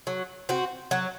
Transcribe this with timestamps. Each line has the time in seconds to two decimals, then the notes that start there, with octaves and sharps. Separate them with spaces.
0.07 F#3
0.49 C4 F#4
0.91 F#3